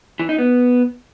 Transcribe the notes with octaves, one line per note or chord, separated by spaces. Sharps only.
E3
D#4
B3